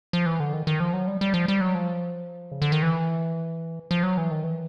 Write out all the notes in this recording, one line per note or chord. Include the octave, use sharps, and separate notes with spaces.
F3
E3
D3
D#3
D#3
F3
F#3
G3
G3
F3
G3
F#3
F3
C#3
D3
D#3
E3
F3
F#3
E3
D#3
E3